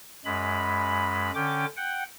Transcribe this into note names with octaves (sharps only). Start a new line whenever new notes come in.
F#2 G#3 B5
D3 C#4 G5 D6
F#5 G5